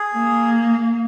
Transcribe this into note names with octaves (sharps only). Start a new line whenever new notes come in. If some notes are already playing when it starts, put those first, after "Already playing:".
Already playing: G#4
A#3